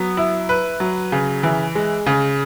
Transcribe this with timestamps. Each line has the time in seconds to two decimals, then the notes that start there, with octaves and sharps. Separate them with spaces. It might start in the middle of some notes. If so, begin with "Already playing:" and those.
Already playing: F#3 B3
0.17 E4
0.49 B4
0.80 F#3
1.12 C#3
1.43 E3
1.75 G#3
2.06 C#3